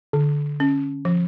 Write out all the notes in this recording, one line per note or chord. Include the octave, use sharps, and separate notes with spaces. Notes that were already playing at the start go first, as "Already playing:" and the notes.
D3
C#4
F3